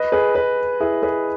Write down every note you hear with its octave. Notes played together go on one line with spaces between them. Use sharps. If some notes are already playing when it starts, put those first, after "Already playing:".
Already playing: B4 D#5
G#4 B4
G#4 B4
E4 G#4
G#4 B4